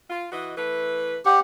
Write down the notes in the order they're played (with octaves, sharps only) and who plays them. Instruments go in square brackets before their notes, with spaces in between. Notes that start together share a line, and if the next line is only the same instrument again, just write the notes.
[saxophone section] F4
E3 F#4 D#5
E3 A3 B4
[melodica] G4 [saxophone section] C#5 D#5 F#5